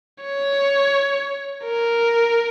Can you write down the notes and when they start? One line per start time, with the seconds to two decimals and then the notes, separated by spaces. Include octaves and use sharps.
0.23 C#5
1.64 A#4